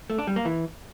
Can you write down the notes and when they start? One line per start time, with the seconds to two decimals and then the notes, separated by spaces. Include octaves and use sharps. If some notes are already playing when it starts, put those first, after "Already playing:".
0.10 A3
0.18 D4
0.27 G3
0.36 A#3
0.45 E3